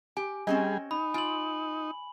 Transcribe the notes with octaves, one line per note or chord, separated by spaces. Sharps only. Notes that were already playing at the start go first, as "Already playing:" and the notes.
G4 G#5
G3 C4 C#4 G#4 D#5
D#4 B5
F4 G#5 F#7